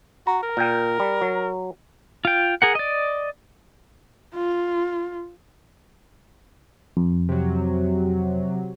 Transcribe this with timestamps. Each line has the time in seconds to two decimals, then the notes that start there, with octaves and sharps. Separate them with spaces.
0.27 F#4 A#5
0.43 A#4
0.57 A#2 G5
1.00 G3
1.21 F#3
2.25 F4 G5
2.62 G#4 A#4 F#5
2.75 D5 D#5
4.35 F4
6.97 F2
7.29 C3 F#3